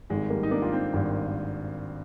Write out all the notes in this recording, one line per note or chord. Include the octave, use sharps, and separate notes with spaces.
G#1 G2 D#3 G#3
G3 A#3
D#4
A#3 D4
F4
C4 D#4
G#1 G2 D#3